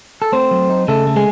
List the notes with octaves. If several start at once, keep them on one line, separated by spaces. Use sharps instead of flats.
A4
A3 C4 C5
F#3
D#4
C#3 A3 A4
A3
G#3 G#4